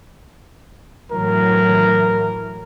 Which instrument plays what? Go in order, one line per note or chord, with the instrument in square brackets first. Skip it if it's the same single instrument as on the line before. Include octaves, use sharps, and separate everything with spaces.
[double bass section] A2 E3 F#3 [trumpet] A#4